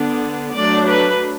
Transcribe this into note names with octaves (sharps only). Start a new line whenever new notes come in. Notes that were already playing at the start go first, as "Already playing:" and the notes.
Already playing: D3 B3 D4
F#3 A3 D4 D5
B4